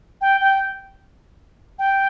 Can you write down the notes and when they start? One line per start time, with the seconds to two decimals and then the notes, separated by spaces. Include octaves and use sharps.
0.21 G5
0.41 G5
1.79 G5